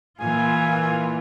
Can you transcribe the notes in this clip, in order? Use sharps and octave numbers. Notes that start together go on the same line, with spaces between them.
A#2 E3 F4 G#5